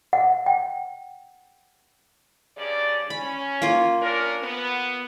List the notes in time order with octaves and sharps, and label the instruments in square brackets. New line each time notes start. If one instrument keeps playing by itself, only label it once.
[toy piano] F#5
G5
[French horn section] G2 C#3 D5
[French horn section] C#4 [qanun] B5
[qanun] A#3 F4
[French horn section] C#4 D4 A#4
B3